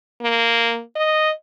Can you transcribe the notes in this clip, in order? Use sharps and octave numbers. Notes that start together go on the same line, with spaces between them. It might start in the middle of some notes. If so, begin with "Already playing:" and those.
A#3
D#5